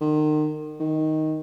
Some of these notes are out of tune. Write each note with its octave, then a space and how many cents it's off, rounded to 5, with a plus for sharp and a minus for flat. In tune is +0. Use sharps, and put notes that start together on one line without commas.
D#3 -35
D#3 +5